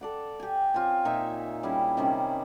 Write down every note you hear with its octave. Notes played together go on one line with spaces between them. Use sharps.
A4 D5 F#5
G4 G#5
C4 F4 C#5 G#5
A#2 D#4 E5 C#6
G3 C#4 E4 G#4
C3 D#3 G3 C#4